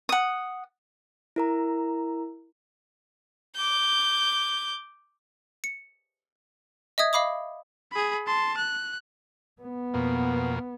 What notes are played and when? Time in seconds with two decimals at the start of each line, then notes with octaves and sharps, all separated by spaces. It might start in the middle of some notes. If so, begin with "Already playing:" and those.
0.09 F#5 D#6
1.36 E4 A#4 A#5
3.55 D6 G6
5.64 C#7
6.98 D#5 E5 D#6 G#6
7.13 D#5 F5 B5 D6 D#6
7.92 G#4 B5
8.27 A5 C6
8.57 F#6
9.62 B3
9.94 F2 B2 A#3